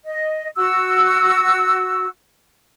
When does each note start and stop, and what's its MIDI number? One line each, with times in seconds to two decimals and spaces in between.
0.04 0.48 75
0.57 2.08 66
0.57 2.08 88